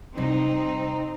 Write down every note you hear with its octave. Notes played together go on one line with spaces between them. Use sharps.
C3 G3 C4 D#4